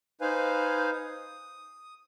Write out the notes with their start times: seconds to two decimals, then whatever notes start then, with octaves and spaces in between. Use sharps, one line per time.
0.21 D#4 B4 C5 F5 G#5
0.93 D#6